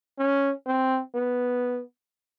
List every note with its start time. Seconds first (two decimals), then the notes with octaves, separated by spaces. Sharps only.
0.18 C#4
0.67 C4
1.15 B3